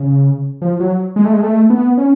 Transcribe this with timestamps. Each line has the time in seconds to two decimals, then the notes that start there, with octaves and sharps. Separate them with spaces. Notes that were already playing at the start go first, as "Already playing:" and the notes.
Already playing: C#3
0.62 F3
0.80 F#3
1.16 G#3
1.25 A3
1.34 G#3
1.43 A3
1.70 B3
1.98 C#4